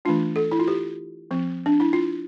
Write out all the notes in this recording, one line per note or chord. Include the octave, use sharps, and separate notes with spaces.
E3 A3 D4 F4
A4
E4
F4
G4
F3 C4
D4
E4
F4